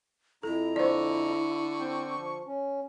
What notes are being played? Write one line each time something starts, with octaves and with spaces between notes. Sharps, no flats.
F2 E4 A4 A#5
D3 C5 D5 C#6
C4 G5
F3
C#4